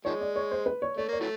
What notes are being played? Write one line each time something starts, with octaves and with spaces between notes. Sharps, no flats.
D#3 F3 G#3 C#5
D5
C#5
C5
B4
C#5
A3 C#5
A#3 C#5
E3 F#3 A3